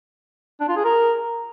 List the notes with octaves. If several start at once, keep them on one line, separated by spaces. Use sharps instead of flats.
D4
F4
G#4
A#4